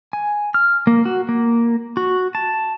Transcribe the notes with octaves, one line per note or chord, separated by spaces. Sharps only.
G#5
F6
A#3
F#4
A#3
F#4
A5